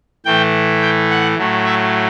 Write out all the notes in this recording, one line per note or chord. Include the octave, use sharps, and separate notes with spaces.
A2 E3 A3 G5
G5
F#5
A2 F#3 A3
E5